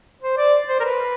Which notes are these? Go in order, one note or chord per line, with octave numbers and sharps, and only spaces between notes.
C5
D5
C5
A#4
B4